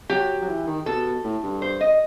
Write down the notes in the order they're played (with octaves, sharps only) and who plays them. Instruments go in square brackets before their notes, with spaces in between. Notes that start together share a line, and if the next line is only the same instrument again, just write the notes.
[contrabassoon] F#3 [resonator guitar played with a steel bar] G4
[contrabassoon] F#3
E3
D#3
[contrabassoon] B2 [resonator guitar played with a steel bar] A4
[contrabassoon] A2
G2
[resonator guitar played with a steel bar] C5
D#5